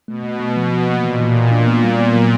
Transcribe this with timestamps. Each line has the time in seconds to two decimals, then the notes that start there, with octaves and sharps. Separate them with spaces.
0.08 B2 A3
0.24 A3
0.40 A3
0.56 B2 F3
0.72 F3
0.88 A#3
1.04 A#2 E3
1.20 E3
1.36 E3
1.51 D4
1.67 B3
1.83 G3
1.99 B3
2.16 F#3